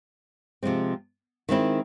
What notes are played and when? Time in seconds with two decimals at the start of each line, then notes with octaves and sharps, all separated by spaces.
0.63 C3 F3 G#3 C4
1.49 D#3 G#3 C4 E4